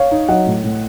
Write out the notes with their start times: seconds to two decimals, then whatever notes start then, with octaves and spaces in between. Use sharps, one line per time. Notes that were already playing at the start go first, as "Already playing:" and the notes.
Already playing: C#5 F5
0.11 D#4
0.28 F#3 D#5 F#5
0.47 A2
0.64 A2